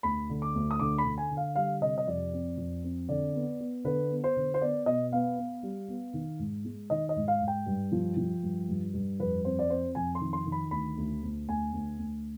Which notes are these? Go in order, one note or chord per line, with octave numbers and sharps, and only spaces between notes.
D2 B5
D3
D6
D2
D#6
D3 D6
B5
D3
G#5
D3
F5
G3 F5
C3 D#5
D#5
F2 D5
C4
F2
C4
D3 D5
B3
B3
D3 B4
B3
C5
D3
C5
B3 D5
B2 D#5
B3 F5
B3
G3
B3
D#3
G#2
G#3
D#3 D#5
D#5
G#2
F5
G#2
G5
G2
F3
F3
G2
G2
G2
F2 B4
C4 C5
D5
C4 C5
F2 G#5
C6
D#3
C6
D#3
B5
D2 B5
D2
D2
D2 G#5
D2
D2